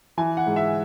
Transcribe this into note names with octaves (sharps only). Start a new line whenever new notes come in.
E3 G#5
F#5
G#2
E5